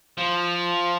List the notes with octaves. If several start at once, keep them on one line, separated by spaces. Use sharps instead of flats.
F3